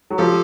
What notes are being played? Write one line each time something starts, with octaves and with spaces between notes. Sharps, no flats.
F#3
F3 G4 A4